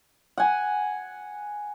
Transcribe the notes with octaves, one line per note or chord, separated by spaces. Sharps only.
F#5 G#5